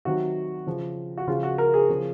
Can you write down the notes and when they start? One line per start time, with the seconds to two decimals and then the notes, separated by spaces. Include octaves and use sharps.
0.05 C3 D#3 F#3 F#4
0.66 C#3 F3
1.18 F#4
1.28 C#3 F3 F4
1.43 F#4
1.58 A#4
1.74 G#4
1.89 C#3 F3